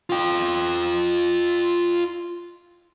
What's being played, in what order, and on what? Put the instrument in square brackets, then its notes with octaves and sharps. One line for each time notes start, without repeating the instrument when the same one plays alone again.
[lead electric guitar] F4 G5